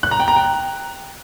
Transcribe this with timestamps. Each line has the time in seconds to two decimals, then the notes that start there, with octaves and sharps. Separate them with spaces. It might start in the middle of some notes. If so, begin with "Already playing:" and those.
0.03 F#6
0.11 A#5
0.20 G5
0.28 A#5
0.36 G5